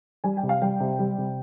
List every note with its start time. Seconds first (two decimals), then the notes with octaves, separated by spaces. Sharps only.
0.24 G3 G#5
0.37 G5
0.43 C3
0.49 F5
0.62 G3 G5
0.80 C3
0.99 G3
1.18 C3